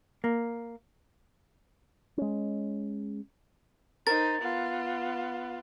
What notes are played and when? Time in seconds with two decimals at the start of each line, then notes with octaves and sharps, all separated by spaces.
0.24 A#3
2.18 G#3 C#4
4.07 D#4 A#4 C5 A6
4.41 B3 F4